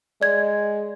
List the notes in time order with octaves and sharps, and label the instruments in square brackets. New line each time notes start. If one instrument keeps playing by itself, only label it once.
[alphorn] G#3 [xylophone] D5 G#6